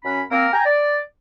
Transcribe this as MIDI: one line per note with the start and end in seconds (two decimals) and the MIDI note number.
0.05 0.21 42
0.05 0.21 61
0.05 0.21 83
0.31 0.48 58
0.31 0.48 60
0.31 0.48 70
0.53 0.63 79
0.53 0.63 80
0.53 0.63 82
0.66 0.99 74